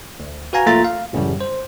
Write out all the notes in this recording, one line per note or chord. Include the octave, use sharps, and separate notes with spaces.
D2
F#4 B4 F5 G#5 A#5
A#1 A3 A#3 F4 A#5 A6
F5
A1 F#2 A2 C#3 G3
C5